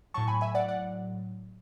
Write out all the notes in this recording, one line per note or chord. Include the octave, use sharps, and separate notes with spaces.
A2 F#3 A5 C#6
G#5 B5
E5 G#5
D5 F#5
D5 F#5